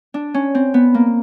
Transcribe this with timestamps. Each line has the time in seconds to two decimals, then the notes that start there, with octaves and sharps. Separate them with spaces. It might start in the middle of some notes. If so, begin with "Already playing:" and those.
0.14 D4
0.34 C#4
0.55 C4
0.74 B3
0.94 A#3